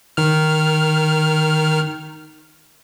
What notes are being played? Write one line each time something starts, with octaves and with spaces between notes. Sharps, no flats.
D#3 F6